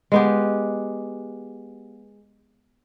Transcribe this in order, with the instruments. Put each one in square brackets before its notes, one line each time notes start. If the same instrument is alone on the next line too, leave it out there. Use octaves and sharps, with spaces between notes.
[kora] G#3 B3 G4